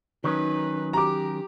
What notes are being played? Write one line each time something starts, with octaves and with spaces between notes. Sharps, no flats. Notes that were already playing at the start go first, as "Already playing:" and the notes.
D#3 F#3 C#4 D#4 B4
G4 A#5 D6